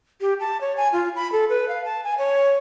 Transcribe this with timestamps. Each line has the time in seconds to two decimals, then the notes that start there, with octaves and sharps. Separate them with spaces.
0.21 G4
0.40 A5
0.61 C#5
0.77 G#5
0.93 F4
1.16 B5
1.32 A4
1.50 B4
1.69 F5
1.85 A5
2.04 G#5
2.18 C#5